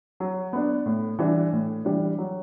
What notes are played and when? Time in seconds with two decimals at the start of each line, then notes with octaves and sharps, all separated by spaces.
0.20 F#3
0.53 B3 D4
0.86 A2
1.19 E3 G3 D4
1.52 A2
1.85 E3 G3 D4
2.18 F#3